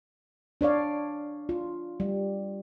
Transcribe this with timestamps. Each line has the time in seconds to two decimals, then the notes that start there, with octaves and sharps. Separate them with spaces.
0.61 D4 C#5 D5 F5
1.49 F4
2.00 G3